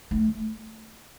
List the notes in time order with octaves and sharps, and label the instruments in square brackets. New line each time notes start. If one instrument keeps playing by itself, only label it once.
[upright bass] A3